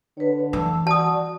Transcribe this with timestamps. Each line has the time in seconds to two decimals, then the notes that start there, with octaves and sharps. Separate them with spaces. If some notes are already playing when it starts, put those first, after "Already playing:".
0.17 D3 B4 C#5
0.53 E3 A5 E6
0.87 F#4 D5 A5 D#6